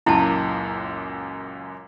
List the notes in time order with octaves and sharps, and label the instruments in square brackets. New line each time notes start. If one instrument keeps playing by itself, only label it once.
[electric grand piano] C#2 F#2 A#2 [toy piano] E4 A5